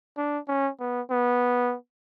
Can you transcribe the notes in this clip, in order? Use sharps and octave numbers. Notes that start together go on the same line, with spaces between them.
D4
C#4
B3
B3